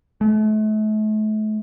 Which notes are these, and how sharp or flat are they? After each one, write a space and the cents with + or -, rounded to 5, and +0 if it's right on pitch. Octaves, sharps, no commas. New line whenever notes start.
A3 -40